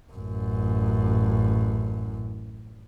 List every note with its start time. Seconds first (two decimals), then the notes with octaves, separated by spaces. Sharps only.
0.13 A1 F#2